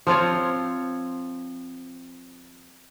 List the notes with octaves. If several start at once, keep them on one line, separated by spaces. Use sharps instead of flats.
F3 C4 F4 C#5